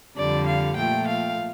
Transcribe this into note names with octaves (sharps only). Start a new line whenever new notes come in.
F2 D3 G3 D5
F5
A#2 F3 A3 G5
F5